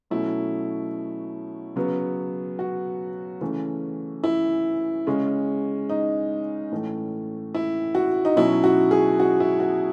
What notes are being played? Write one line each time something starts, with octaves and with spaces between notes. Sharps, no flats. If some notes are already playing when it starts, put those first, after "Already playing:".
B2 F#3 A3 C#4 E4
C#3 F#3 B3
F#4
C#3 E3 A3 C#4
E4
C#3 G#3 C#4
D#4
A2 E3 A3 C#4
E4
F#4
D#4
B2 F#3 C#4 E4
F#4
G#4
F#4
E4
F#4